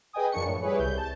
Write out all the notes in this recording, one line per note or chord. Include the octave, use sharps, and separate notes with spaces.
G#4 B4 D#5 G5 G#5 D#6
F#2 F3 A#3 D4 C#6 C#7
A2
G3 E4 G#4 B4 C#5
C2 G6
A5